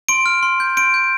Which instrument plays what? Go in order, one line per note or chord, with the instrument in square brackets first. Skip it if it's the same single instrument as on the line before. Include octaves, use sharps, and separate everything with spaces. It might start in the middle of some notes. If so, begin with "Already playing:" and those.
[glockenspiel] C6 D7
F6
C6
G6
C6 D7
G6